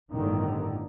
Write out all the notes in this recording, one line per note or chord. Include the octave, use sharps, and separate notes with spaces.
G1 A2 D3 D#3